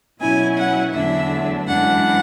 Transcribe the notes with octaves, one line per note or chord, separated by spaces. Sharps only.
B2 F#3 C#4 E4 G#5
F#5
E2 D3 F#3 A3 D4 E5
F#2 E3 G#3 D4 F#5